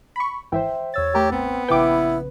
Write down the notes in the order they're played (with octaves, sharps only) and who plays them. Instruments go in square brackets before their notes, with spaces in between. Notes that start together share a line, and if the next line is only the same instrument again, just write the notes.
[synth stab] B5 C#6
[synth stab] G#1 E3 [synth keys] C5 E5 G5
[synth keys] E2 E6 A6 [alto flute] C#5
[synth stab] A3 A#4 [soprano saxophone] G4
[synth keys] A1 [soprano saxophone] B3 [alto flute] C4
[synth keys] A#1 C#3 B4 [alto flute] E4 [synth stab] G5 D6